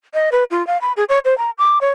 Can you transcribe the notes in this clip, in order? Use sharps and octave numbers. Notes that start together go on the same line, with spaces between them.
D#5
B4
F4
F5
B5
G#4
C#5
C5
A#5
D6
C#5